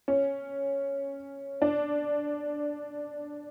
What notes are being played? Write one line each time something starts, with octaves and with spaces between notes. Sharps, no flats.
C#4
D4